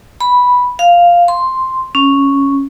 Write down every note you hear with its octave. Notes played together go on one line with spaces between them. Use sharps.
B5
F5
C6
C#4